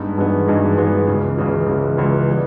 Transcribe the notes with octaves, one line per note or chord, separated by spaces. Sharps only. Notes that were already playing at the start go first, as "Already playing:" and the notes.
Already playing: G2 G#3 B3 D#4
G2 E3 G#3 B3 D#4
G2 E3 G#3 B3 D#4
G2 E3 G#3 B3 D#4
C#2 C#3 E3
C#2 C#3 E3
C#2 C#3 E3
C#2 C#3 E3
E3 G3 B3